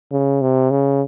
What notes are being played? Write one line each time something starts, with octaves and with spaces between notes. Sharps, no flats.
C#3
C3
C#3